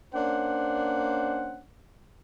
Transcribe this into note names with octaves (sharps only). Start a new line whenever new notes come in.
A#3 C#4 D4 C5 F#5